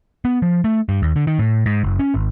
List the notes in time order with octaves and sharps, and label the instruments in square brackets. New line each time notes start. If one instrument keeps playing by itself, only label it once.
[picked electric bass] B3
F3
A3
G2
D#2
D3
D#3
A2
G#2
F#1
C#4
G#1